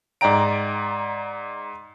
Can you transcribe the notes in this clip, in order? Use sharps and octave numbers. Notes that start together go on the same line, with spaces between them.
G#2 D5 D#5 G5 A#5 D7